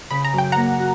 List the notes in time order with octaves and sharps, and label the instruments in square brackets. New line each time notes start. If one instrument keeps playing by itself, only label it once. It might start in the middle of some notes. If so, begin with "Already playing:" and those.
[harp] C#3 [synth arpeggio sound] B5
[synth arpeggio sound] A#5
[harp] F#2
[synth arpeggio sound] G5
[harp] A#3 [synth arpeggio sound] F#5 A#5
[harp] F#4